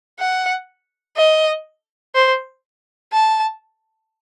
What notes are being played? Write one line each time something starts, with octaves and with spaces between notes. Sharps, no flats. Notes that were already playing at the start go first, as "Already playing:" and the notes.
F#5
D#5
C5
A5